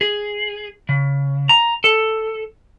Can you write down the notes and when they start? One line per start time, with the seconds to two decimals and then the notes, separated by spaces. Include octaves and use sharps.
0.01 G#4
0.89 C#3
1.49 A#5
1.84 A4